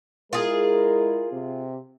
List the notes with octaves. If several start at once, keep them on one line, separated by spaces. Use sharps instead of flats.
G#3 E4 F4 G#4 A#4
C3 C4